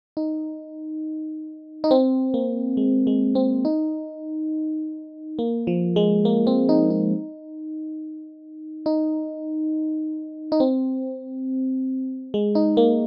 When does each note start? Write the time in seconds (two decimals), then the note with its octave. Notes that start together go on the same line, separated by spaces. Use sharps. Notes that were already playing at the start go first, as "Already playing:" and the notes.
0.17 D#4
1.84 D#4
1.91 C4
2.34 A#3
2.77 G#3
3.07 G#3
3.35 C4
3.65 D#4
5.39 A#3
5.67 F3
5.96 G#3
6.25 A#3
6.47 C4
6.69 D#4
6.90 D#4
8.86 D#4
10.52 D#4
10.60 C4
12.34 G#3
12.55 D#4
12.77 A#3